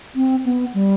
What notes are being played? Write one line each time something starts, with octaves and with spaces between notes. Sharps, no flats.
C4
B3
G3